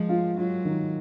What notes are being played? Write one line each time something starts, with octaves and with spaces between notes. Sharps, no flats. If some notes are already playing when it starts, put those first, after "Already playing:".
Already playing: F3 G#3
F4
F#3 F4
D#3